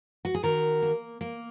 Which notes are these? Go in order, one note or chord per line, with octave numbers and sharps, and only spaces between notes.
F#4
G#4
D#3 F#4 A#4
A#3
A#3